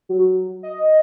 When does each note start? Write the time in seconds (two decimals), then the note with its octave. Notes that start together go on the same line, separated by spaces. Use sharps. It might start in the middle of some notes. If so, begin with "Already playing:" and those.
0.09 F#3
0.63 D#5